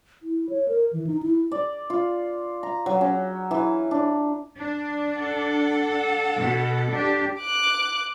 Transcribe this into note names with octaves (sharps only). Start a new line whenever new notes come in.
E4
C#5
A#4
E3
D#4
E4
D5
F4
A#5
F#3
C#4
E3
D4
D4
A4 F#5
B2
D4 G4
D6 F#6